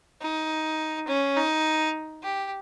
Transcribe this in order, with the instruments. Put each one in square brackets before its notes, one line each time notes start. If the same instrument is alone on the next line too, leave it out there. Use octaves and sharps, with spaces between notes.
[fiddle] D#4
C#4
D#4
G4